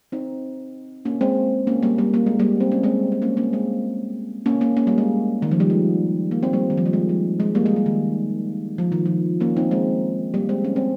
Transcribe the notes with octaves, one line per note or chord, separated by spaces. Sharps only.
C4 D#4
A#3 C#4
G#3 C4
A#3 C#4
G3 A#3
G3 A#3
A#3
G#3
G3 A#3
C4
C#4
G#3 C4
C4
A#3 C#4
A#3 C#4
G#3 C4
A#3 C#4
A#3 C#4
A#3 C#4
G3 A#3
G#3
D#3
F3
G3
G#3
A#3
C4
G3 A#3
D#3
F3
G3
G#3
G3
G#3
G3 A#3
G#3
G3
D#3
F3
D#3
F3
A#3 C#4
C4 D#4
G#3 C4
G3 A#3
G#3 C4
C#4
C4